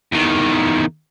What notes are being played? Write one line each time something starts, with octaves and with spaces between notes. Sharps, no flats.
E2 D#3